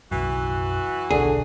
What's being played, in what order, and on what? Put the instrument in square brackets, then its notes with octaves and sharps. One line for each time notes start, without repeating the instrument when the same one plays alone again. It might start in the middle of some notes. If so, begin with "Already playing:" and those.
[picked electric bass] F#1 B1 F#2 [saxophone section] E3 F#4
[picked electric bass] D#1 B1 [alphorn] D3 [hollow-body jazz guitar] G#4